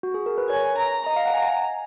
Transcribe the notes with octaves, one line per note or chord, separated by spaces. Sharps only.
F#4
G#4
A#4
B4
C#5 G#5
A#5
D#5 A#5
F5
F#5
G#5